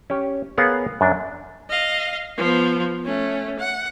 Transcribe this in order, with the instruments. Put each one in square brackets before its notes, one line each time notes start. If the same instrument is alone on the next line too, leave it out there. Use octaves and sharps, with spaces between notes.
[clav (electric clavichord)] C#4 G4
B3 G#4 A#4 C#5 F5 F#5
F#2 D4
[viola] D#5 F5
F3 B3
A3 C#4
F#5